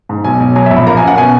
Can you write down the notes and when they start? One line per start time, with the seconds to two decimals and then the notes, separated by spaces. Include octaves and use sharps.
0.09 G#2
0.24 B1 G#5
0.40 B1
0.56 F#3 G#5
0.66 E5
0.71 A#1
0.76 B5
0.87 A#3 A#5
0.97 G#5
1.03 F#2 F#5
1.18 B2 G#5